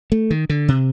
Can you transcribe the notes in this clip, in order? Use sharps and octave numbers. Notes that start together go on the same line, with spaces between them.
A3
D#3
D3
C3